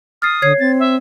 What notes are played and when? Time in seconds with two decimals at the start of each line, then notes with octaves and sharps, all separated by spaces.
0.22 D#6 F6 A6 C7
0.42 D3 C#5 G#6 C7
0.59 C4 A6
0.79 E5